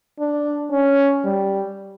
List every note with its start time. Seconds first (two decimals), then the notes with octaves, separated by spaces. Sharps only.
0.19 D4
0.72 C#4
1.25 G3